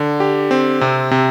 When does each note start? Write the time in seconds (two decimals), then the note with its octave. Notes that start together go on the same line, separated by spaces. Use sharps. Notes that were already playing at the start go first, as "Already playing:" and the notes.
Already playing: D3
0.20 G4
0.51 C4
0.81 C3
1.11 C3